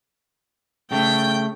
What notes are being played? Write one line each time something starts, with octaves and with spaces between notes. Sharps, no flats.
C#3 A3 G5